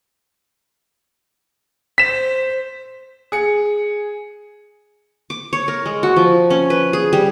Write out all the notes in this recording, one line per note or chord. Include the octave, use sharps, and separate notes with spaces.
C5 B6 E7
G#4 C#7
D6
C#5
A#4
G#3
F#4
F3
C#4
B4
G#4
G3